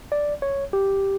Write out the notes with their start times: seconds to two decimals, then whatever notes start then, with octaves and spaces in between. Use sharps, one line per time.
0.12 D5
0.42 C#5
0.73 G4